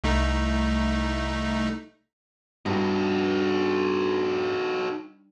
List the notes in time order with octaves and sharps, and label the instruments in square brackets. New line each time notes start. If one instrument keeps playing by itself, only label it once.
[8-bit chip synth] C2 A3 D#4
[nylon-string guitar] G2 [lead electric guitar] D#4 F#4